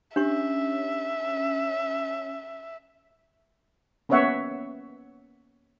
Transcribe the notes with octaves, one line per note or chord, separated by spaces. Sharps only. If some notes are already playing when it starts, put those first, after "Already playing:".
C#4 D4 G4 E5 C#6
A#3 B3 C#4 C#5 E5 F#5